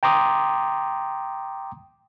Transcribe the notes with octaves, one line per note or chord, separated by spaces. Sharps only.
G5 A#5 C6 D6 D#6